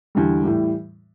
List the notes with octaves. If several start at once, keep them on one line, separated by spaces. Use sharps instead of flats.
E2 D3 G3
A2 E3 G3